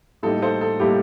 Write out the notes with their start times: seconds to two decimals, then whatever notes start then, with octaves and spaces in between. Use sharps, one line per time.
0.23 A2 G3 A#3 D#4 A4
0.42 A4 C5
0.61 A4
0.80 A2 G3 A#3 D#4 G4